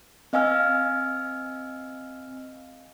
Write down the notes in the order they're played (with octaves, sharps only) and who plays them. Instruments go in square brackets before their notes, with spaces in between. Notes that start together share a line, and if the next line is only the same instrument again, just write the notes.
[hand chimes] C4 D#5 F5 G#5 E6 F6